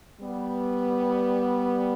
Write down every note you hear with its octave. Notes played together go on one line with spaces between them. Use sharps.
G3 B3